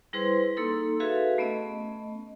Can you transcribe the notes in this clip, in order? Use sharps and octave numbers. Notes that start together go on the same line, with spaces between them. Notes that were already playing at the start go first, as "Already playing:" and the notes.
G3 E4 G#4 B4 C5 C6
A#3 D#4 A4 C6 E6
F#4 G#4 A4 B4 E5 F5
A3 B3 C#4 D#5